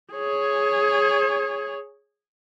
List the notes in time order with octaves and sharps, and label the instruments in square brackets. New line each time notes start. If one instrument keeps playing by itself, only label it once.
[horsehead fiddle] G#4 C#5